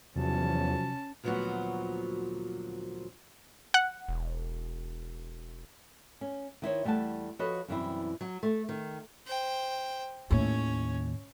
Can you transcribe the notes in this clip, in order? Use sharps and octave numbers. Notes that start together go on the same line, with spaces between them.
E2 C3 F3 F#3 C#4 A5
D2 A#2 F3 F#3 B3 F#4
F#5
E1
C#4
D#3 E4 C5 C#5
E2 G3 A3 B4 F#5 A5
F3 F#4 A4 B4 C#5 D#5
F#2 B2 E3 G3 C4 E4
F#3
A3
D#3
C5 G5
D#2 A2 C#4 C#5